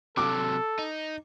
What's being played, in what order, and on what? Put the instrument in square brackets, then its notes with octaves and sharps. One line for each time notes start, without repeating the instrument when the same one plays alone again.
[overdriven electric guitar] C3 F#3 [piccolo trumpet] A4 [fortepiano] D6
[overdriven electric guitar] D#4